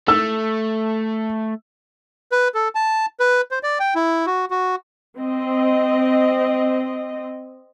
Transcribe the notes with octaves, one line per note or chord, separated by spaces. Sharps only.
A3 E6
B4
A4
A5
B4
C5
D5
G5
E4
F#4
F#4
C4 D#5